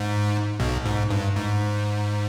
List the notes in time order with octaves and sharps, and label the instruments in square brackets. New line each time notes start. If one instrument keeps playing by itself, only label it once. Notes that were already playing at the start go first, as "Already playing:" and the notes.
Already playing: [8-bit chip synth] G#2
B1 B2
G#2
G2
G#2